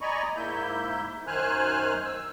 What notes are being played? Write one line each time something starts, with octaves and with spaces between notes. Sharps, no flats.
D5 D#5 G#5 A#5 B5 C#6
G#2 A#3 E4 E5 G6
F#2 D#3 C5 G#5 F6 F#6
E6